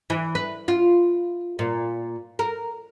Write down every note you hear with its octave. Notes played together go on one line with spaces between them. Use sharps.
E3
B4
F4
A#2
A#4